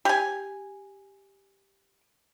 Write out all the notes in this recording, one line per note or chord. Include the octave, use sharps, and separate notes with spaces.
G4 G#5